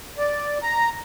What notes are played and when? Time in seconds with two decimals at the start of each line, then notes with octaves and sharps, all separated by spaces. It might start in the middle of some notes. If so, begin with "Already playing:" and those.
0.18 D5
0.63 A#5